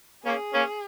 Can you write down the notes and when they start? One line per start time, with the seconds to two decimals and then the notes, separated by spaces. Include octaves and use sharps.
0.25 A#3 C#4 G#4
0.53 A#3 C#4